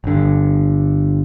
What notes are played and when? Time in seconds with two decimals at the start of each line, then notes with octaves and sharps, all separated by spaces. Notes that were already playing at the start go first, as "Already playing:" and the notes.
0.04 G1 D3